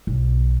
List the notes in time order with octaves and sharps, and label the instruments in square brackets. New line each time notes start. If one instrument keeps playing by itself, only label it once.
[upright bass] B1